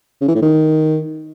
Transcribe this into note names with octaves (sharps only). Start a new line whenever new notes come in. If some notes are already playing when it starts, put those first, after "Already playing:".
C#3
E3
A2
D#3